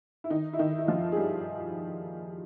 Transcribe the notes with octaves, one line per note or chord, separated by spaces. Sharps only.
E4
D#3 D#4
E4
D#3 D#4
E4
F3 F4
G#4
G3 G4